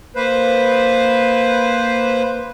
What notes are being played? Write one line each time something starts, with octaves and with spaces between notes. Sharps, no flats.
A#3 B4 C5